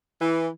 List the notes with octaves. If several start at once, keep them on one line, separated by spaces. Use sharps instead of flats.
E3